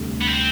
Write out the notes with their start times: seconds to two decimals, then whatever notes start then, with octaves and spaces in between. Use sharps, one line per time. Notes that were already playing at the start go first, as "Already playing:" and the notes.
Already playing: D2 C3 G3 D4
0.21 B3
0.28 C4